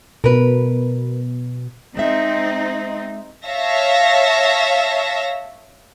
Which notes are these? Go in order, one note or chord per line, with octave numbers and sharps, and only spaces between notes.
B2 A#4 B4
G#3 C4 D#4 E5
C#5 E5 F5 A5 A#6